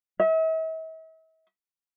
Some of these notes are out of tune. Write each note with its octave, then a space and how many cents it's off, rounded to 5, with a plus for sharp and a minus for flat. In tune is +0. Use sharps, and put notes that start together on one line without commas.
E5 -45